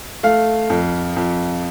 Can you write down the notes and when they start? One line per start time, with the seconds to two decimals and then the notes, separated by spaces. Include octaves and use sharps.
0.23 A3 F5
0.70 F2
1.16 F2